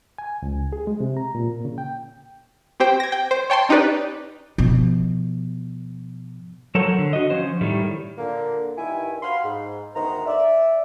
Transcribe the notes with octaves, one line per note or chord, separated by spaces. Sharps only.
G#5
C#2
G#4
G#3
C3
A#5
A#2
C#3
G5
C4 G4 C5 G5
G#6 A#6
G5
C5
C#5 G5 A5 C6
C#4 D#4 G4 B4 D5
B2 F3
F#3 A4 A#4 C5 C#5 F#5
D3
F#4 D#5
F3 C#4 C5
A2 D#3 G3 A3
A#2 D3 A#3
G2 D#3 E4 G#5
F#4 F5 B5 C6
G#2
D2 D#3 G#3 B3 C5 A#5
D5 E5